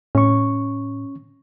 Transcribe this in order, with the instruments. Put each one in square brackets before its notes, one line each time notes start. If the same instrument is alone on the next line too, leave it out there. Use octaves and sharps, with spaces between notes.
[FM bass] A2 [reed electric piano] C#4 C#6